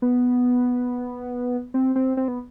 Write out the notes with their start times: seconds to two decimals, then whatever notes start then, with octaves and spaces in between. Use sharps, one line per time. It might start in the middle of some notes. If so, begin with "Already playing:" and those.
0.02 B3
1.74 C4
1.96 C4
2.17 C4
2.28 B3